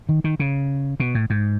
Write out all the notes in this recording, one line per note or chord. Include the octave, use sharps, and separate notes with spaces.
D#3
D#3
C#3
B2
A2
G#2